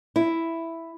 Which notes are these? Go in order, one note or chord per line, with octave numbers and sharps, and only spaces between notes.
E4